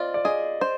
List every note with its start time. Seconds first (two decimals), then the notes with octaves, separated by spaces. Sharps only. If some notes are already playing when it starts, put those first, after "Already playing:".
Already playing: C4 F4 D5 D#5
0.14 D5
0.25 G#4 D#5
0.61 C5